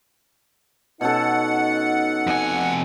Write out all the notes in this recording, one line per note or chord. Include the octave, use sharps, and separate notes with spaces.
B2 C#4 D#4 A4 F#5
F2 G#5